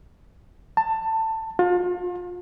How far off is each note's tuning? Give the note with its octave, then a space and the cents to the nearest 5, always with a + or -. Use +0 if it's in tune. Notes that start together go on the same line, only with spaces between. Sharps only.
A5 +20
F4 +35